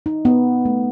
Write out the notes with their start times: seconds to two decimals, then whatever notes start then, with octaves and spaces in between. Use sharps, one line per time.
0.06 D#4
0.25 B3
0.65 A3